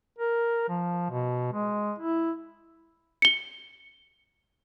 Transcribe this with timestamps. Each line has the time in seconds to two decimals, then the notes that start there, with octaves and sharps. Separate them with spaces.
0.19 A#4
0.69 F3
1.10 B2
1.52 G#3
1.99 E4
3.22 C#7 G7